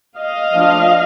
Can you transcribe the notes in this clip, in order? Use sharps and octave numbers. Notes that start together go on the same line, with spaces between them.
D#5 F5
F3 A3 D4 F4